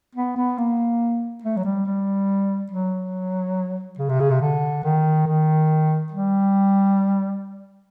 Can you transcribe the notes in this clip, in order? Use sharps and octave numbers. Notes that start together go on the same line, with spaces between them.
B3
B3
A#3
A3
F#3
G3
G3
F#3
C#3
C3
C#3
C3
D3
D#3
D#3
G3